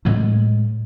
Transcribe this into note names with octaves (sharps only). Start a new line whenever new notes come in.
A2 G#3